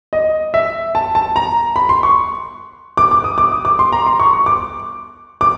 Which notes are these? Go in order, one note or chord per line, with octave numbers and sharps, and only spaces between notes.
D#5
E5
A5
A5
A#5
B5
C6
C#6
D6
D6
D#6
D6
D#6
D6
C6
A#5
C6
C#6
C#6
D6
D6